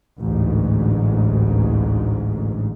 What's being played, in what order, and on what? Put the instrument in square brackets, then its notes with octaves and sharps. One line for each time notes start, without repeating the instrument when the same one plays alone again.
[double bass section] A1 D2 G#2